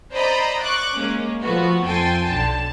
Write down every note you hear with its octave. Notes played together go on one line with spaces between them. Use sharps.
C5 D5 D#5 A#5 B5
C#6 D6 F#6
G#3 A#3 C#4
F3 A3 B3 F#4
F2 A4 G5 G#5 C6 A6
B1 D3 A5